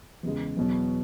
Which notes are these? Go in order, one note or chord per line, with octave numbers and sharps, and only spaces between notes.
E2 C#3 G#3
E2 B2 F#3